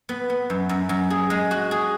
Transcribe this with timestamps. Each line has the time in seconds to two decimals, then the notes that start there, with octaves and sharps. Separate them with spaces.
0.09 B3
0.30 B3
0.50 F#2
0.69 F#2
0.89 F#2
1.10 G#4
1.30 G#3
1.51 F#4
1.71 G#4